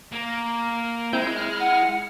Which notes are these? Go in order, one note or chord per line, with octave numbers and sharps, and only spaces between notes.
A#3
G#3 C4 E4 G6
E4 F6
F#5